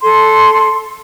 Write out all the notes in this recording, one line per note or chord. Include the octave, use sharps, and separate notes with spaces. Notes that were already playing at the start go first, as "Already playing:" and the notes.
A4 C6